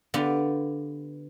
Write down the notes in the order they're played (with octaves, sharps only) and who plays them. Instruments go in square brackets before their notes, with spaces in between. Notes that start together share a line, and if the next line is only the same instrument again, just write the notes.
[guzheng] D3 B3 F4 G4 D5